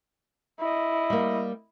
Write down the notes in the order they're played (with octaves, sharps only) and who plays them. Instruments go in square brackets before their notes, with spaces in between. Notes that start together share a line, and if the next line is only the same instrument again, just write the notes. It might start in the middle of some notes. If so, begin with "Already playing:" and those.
[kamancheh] E4 D#5
[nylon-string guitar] G3 A#3